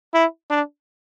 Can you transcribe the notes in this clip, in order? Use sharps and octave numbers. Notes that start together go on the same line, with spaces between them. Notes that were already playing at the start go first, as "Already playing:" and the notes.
E4
D4